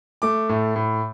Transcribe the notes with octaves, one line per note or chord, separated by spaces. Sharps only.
A3 D6
A2
A2